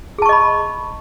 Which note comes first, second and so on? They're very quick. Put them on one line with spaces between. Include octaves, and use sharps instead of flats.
G#4 A5 C#6 D#5 B5